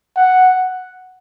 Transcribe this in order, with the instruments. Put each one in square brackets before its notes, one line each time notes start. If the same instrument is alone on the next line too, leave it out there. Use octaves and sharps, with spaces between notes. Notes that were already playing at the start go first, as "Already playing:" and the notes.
[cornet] F#5